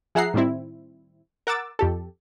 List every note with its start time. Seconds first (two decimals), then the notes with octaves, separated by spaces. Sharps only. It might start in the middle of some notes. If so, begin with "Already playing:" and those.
0.15 F3 G#4 E5 F#5 A#5 C7
0.34 A2 D#3 G3 C4 E4
1.47 A#4 F#5 D6 E6 A6
1.79 F2 G4 A4